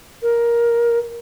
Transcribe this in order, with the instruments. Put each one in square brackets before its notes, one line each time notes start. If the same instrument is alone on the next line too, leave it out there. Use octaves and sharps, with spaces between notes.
[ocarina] A#4